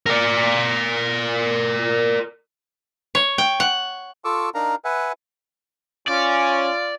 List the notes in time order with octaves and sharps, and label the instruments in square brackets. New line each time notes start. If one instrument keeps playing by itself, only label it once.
[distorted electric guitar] A#4 D5
[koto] C#5
G5
F#5
[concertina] F4 A4 C#6 D6 E6
D4 D#4 A#4 F5 A#5
B4 E5 F#5 G#5
[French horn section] C#4 [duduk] F4 [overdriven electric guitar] D5